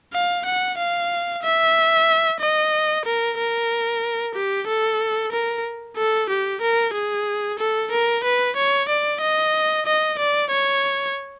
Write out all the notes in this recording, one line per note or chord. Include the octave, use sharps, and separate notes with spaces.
F5
F#5
F5
E5
D#5
A#4
A#4
G4
A4
A#4
A4
G4
A#4
G#4
A4
A#4
B4
C#5
D5
D#5
D#5
D5
C#5